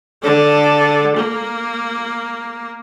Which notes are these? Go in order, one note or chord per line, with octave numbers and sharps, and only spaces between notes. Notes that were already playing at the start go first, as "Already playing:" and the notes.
D3 A4
A#3